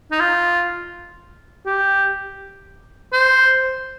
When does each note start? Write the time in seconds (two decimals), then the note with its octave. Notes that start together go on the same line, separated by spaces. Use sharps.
0.12 D#4
0.20 F4
1.66 G4
3.13 C5